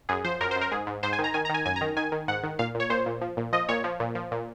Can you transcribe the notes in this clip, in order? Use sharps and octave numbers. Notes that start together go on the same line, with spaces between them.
F#2 G#4
F3 C5
F#2 A#4
C5
F#2
A#4
G#2 G#4
G#2
G#2 C5
G#5
D#3
A#5
D#3 G#5
A#5
D#3 G#5
F#2 G#5
A#5
D#3
D#3 G#5
D#3
G#2 F#5
D#3
A#2 F5
A#2
C#5
A#2 C5
A#2
F3
A#2
F3 D#5
A#2 C#5
F3
A#2
F3
A#2